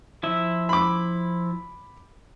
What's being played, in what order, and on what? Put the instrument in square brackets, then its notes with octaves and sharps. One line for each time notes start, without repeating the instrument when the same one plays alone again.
[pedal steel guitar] F3 E4 E5
[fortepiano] B5 D6